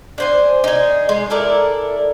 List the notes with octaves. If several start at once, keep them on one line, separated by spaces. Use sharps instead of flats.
D4 C5 G#5
D#4 G#4
G#3 D#5
E4 A4 A#4 D5